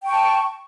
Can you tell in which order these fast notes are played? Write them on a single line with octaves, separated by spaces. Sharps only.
G5 C#6 A5